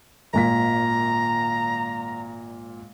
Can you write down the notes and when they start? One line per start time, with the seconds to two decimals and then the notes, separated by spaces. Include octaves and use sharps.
0.34 G#1 A#2 A#5 B6